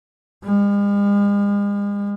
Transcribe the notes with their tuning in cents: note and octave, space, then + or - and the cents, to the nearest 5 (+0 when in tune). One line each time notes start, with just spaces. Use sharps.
G#3 -45